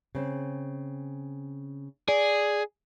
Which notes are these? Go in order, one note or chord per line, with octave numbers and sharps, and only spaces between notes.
C#3 C4
G#4 D5